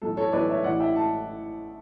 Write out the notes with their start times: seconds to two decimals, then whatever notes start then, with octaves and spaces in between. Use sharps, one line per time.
0.02 B1 A2 E3 A4
0.17 A4 C#5
0.32 B1 A2 E3 B4 D5
0.48 C#5 E5
0.64 A1 A2 E3 D5 F#5
0.80 E5 G5
0.96 A5